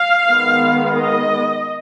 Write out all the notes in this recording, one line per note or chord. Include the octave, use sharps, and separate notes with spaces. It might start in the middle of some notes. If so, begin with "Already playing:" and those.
Already playing: F5
D#3 G#3 B3
D#5